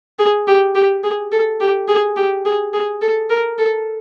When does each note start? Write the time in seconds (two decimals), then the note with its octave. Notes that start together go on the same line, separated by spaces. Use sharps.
0.19 G#4
0.47 G4
0.75 G4
1.03 G#4
1.32 A4
1.60 G4
1.88 G#4
2.16 G4
2.45 G#4
2.73 G#4
3.01 A4
3.30 A#4
3.58 A4